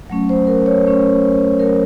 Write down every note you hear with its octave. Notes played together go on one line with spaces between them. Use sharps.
F#3 A3 C#4
C5
A#4
C#5
F#3 A3 C#4
F#3 A3 C#4 A#4